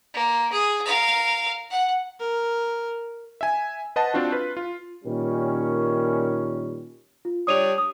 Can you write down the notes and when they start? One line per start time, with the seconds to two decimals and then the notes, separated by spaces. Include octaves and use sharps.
0.14 A#3
0.52 G#4
0.86 A#4 F5
1.70 F#5
2.20 A#4
3.41 E5 G#5
3.96 B4 C5 D#5 F#5 A5
4.14 C4 D4 F4 F#4
4.32 F4 B4
4.57 F4
5.05 A#2 D#3 G3 C#4
7.25 F4
7.47 G3 D4 C#5 D#6 D#7 F7
7.78 D#6